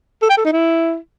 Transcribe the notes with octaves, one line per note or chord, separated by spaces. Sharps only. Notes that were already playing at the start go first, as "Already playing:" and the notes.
A4
G5
A4
D#4
E4